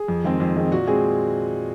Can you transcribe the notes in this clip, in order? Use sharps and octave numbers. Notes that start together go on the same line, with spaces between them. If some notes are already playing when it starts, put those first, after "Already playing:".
Already playing: G#4
F2
D#3 G#3 C4
F2
D#3 G#3 C4
A#2 F#4
G#3 C4 G#4